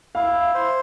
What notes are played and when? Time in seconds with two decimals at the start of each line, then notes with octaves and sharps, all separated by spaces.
0.15 E4 F5
0.54 C5